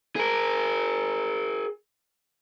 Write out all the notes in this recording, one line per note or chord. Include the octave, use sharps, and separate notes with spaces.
G#4 A#4